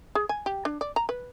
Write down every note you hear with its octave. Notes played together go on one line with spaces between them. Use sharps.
G#4
G#5
G4
D4
D5
A#5
B4